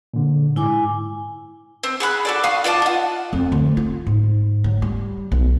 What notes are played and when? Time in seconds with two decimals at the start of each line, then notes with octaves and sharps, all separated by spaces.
0.14 A#2 D3
0.56 G#2 E4 G#5 D6
1.83 C4
2.00 G#4 F#5 B5 F#6
2.25 F#4 A4 D5
2.44 F5 C#6 D#6
2.64 F4 D5 D#5 A5
2.82 F4 F#5
3.33 F2
3.52 D2
3.77 F4
4.07 G#2
4.64 F#3
4.82 G3
5.32 B1